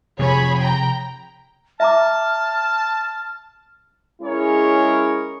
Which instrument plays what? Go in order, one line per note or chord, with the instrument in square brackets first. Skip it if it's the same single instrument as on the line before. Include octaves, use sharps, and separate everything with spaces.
[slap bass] C3 F3 [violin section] G#4 C#5 B5
[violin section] G5 A#5
[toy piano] E5 A#5 D6 [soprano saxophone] A5 [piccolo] F6
[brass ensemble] G#3 C#4 E4 G#4 A#4 C#5